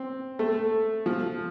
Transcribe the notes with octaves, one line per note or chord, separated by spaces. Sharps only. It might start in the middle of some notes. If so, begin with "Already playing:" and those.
Already playing: C4
A3
F3